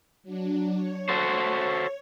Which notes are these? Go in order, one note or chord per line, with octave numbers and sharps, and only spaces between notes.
F#3 D4
C#5
F#4 A4 C5